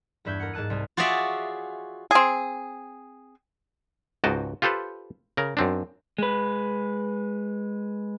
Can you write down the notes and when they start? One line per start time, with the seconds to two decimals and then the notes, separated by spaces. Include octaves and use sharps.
0.25 E2 G2 B4 E5 G6 G#6
0.40 A#4 F#5
0.53 G#2 A#3 A5 F#6 D#7
0.70 C2 G#4
0.97 F4 F#4 G#4 C#5 D5 E5
2.11 C4 G#4
4.24 C#2 G#2 F#4 D#5 G5 A5
4.62 F4 G4 A4 B4 C5
5.37 C#3 A#4
5.57 F#2 C4 D4
6.18 G#3 B4